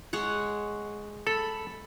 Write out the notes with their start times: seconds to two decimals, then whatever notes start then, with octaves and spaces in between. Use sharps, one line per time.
0.13 G#3 C#5 F#5
1.27 A4 B5